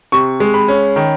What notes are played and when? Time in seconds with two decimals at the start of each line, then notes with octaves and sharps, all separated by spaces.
0.12 C3 C#6
0.40 G#3
0.54 B5
0.68 C#4
0.96 D#3